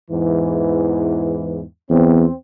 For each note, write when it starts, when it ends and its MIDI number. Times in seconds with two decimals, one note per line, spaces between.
0.11 1.62 40
0.11 1.62 44
0.11 1.62 52
1.90 2.24 40
1.90 2.33 60